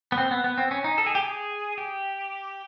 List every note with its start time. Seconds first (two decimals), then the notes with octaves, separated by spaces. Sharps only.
0.12 B3
0.18 C4
0.31 B3
0.44 B3
0.58 C4
0.71 C#4
0.84 D#4
0.98 A4
1.06 G#4
1.15 G4
1.23 G#4
1.78 G4